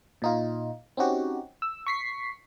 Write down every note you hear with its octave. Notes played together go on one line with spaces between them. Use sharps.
A#2 D#4 F4
C4 C#4 D#4 F#4 G4
E6
C#6 B6 C7